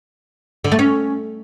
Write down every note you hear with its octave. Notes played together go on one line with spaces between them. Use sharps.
D3
A3
C#4